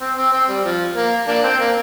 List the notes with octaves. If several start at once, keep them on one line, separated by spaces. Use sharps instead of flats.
C4
C4
C4
G3
F3
A#3
A#3 D4
C4
A#3